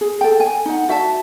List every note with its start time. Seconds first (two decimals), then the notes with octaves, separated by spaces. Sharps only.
0.01 G#4
0.21 A4 G5
0.40 G#5
0.66 D#4 F#5
0.89 F#4 E5 F5 A5